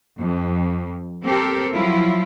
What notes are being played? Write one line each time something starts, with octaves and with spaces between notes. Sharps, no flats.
F2
C4 G4 A4 A#4
F3 F#3 E4 F4